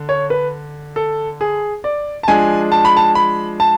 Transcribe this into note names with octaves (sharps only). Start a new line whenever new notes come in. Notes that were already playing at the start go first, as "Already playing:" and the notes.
Already playing: D3
C#5
B4
A4
G#4
D5
A5
F3 G#3 D4 G#5
A5
B5
A5
B5
A5